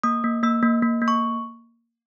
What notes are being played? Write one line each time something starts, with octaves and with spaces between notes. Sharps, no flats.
A#3 D#6
A#3
A#3 E6
A#3
A#3
A#3
C#6